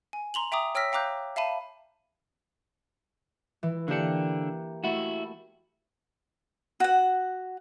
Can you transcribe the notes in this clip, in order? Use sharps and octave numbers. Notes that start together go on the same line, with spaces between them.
G#5
A#5 C6 F7 F#7
E5 G5 A#5 D6 D#6
C#5 G5 E6 F6 A#6 B6
F5 G5 A#5 D6 F#6 G6
E5 F5 A5 B5 D#7
E3
D3 A#3 D4 G4 C#7
A3 E4 F#4
F#4 F#5